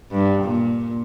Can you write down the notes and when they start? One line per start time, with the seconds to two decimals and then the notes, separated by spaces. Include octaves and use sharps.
0.11 G2
0.42 A#2